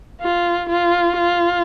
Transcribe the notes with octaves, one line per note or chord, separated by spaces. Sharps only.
F4
F4
F4